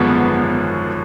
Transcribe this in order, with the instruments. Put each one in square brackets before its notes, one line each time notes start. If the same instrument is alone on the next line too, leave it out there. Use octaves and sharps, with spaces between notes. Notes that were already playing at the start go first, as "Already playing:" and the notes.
Already playing: [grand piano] G#1 F#2 D3 F3 G#3 [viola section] B3